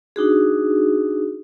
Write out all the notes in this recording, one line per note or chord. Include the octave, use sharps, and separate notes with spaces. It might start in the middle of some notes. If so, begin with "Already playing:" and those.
D4 D#4 F#4 G#4